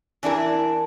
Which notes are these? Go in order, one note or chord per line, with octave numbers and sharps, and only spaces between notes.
E3 D4 E4 A#4